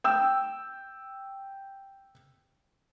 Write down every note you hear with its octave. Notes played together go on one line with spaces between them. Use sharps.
G5 E6